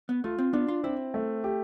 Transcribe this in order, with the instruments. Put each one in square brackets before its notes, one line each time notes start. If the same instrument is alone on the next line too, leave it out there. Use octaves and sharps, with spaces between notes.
[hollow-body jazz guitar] B3
[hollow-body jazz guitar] A3 [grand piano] F4
[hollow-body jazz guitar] C4
[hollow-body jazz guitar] B3 [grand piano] D4
[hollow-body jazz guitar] F4
[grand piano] C4 [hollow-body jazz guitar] E4
[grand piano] A3
G4